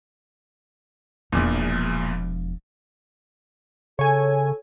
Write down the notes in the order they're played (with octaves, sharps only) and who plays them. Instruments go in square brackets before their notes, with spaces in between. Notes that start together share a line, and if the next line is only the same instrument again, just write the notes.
[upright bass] E1 F3 [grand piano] A#1 E2 A#2
[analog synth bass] C#3 [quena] A4 [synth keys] C#5 G#5